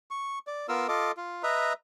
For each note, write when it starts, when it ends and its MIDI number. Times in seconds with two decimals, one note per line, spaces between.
0.11 0.39 85
0.47 0.67 74
0.68 0.87 59
0.68 0.87 65
0.68 0.87 70
0.68 0.87 88
0.88 1.12 65
0.88 1.12 69
0.88 1.12 75
0.88 1.12 86
1.17 1.42 65
1.43 1.73 71
1.43 1.73 75
1.43 1.73 76
1.43 1.73 82